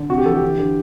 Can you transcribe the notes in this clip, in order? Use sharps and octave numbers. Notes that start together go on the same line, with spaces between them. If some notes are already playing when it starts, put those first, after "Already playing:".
Already playing: D3
C3 F#4
G4
E3 A4
G4
D3
D3